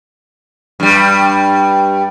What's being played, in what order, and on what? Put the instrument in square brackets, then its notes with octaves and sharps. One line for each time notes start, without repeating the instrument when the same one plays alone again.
[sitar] G2 G3